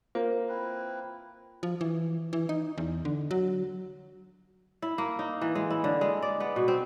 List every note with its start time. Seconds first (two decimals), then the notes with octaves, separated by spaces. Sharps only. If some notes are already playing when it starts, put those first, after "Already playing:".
0.15 A#3 F4 C5 F5
0.48 C4 E4 B4
1.63 F3
1.81 E3
2.33 E3
2.49 D#4
2.78 E2
3.05 D3
3.31 F#3
4.82 E4
4.98 A#3
5.19 D#4
5.42 E3
5.55 G#3
5.70 E4
5.84 D3
6.01 G#3
6.22 D5
6.40 B3
6.56 B2
6.68 C4